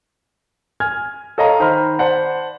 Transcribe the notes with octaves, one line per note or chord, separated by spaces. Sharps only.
G#5 F6 G#6
A4 C#5 D#5 F5 A#5
D#3 C5 A#5 B5 F6
C5 D5 F#5 A5 B5